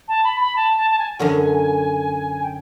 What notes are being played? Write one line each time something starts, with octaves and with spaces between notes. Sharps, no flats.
A5
B5
B5
A5
A5
A5
G#5
F#2 D3 F#3
G5